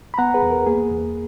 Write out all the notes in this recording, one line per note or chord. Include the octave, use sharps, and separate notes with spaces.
B5
B3 F#5 A#5
G#4 B4
E2
A#4
A#3 G#4
E2